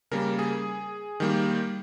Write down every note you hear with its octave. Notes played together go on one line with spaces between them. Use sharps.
C#3 G3 A#3 A#4
G#4
D#3 G3 A#3